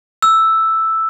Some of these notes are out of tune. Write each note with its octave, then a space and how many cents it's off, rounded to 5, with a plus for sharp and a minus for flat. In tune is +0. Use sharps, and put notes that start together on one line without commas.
E6 +0